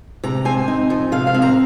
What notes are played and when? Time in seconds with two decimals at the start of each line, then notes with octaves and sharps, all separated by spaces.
0.24 C3 A#5
0.45 C4 G#5
0.68 D#4
0.90 F3
1.12 C3 F5
1.27 F5
1.34 C4
1.42 A#5